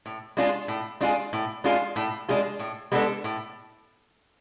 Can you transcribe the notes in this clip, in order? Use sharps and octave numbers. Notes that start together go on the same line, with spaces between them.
A2
G#3 D4 F4 G#4
A2
G#3 D4 F4 G#4
A2
G#3 D4 F4 G#4
A2
G#3 D4 F4 G#4
A2
G#3 B3 D4 A4
A2